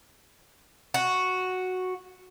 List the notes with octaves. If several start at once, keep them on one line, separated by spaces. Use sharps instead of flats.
F#4